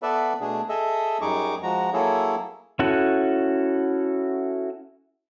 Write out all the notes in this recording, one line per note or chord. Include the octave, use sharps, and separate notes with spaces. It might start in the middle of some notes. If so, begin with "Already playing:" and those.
B3 A4 B4 D5 E5
B2 A3 D4 G#4
G#4 A4 D#5 E5
F#2 G3 D#4 G#4 C#6 D6
F3 G#3 F#4 A#5
F#3 A#3 E4 G#4 A4 C#5
C#4 E4 F#4 A4 F#5